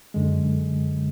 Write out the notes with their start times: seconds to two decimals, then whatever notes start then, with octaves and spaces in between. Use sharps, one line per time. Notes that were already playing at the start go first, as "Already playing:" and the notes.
0.14 F#2 D3 G#3